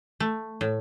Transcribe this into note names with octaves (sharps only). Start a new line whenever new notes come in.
A3
A2